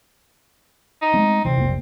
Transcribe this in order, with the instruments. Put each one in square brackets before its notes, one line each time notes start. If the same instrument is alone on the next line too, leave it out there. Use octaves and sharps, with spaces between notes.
[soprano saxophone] D#4
[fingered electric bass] G#3 A3 C4
[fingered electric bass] C3 E3 [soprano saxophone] C4
[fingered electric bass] F1 B1 A#3